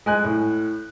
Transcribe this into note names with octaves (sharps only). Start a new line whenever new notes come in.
G#3 G#5 F#6
A2